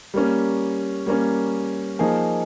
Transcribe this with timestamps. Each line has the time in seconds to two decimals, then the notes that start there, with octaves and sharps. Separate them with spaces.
0.14 G3 A#3 C#4
1.06 G3 A#3 C#4
1.99 F3 A#3 D#4 G#4